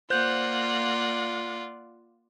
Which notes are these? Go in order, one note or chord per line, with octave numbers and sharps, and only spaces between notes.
A#3 F4 C5 D5 F#5 F#6 G6